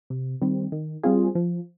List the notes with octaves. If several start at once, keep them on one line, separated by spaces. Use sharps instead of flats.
C3
D#3 G3 C4
D#3
G3 C4 F4 G#4
F3